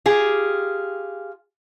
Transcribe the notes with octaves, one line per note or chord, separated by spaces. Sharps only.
F4 G4 G#4